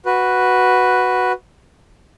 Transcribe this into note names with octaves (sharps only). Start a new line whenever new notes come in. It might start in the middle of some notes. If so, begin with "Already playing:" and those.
F#4 B4